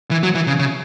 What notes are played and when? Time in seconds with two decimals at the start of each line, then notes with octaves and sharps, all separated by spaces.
0.11 E3
0.23 F#3
0.35 E3
0.47 C#3
0.59 C#3